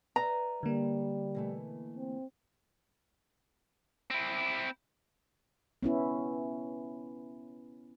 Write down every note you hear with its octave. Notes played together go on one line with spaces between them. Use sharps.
B4 D5 E5 A#5
D3 G3 A#3
B2 E3 A3
C4
C4 E4
B3 C#4 E4